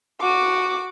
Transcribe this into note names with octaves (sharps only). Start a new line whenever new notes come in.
F#4 D6